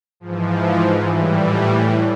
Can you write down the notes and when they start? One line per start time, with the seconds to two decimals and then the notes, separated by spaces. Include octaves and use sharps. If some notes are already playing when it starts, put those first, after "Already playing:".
0.20 G#2 E3 F3
1.09 A2 E3 G3